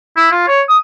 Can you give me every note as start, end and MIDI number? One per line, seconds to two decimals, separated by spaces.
0.17 0.31 64
0.32 0.45 65
0.48 0.61 73
0.69 0.78 87